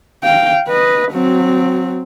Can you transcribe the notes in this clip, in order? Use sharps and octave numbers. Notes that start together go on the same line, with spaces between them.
F5 G5
B4 D#5
F#3 C4